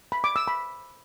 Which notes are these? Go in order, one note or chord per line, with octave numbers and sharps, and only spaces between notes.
B5
D6
E6
B5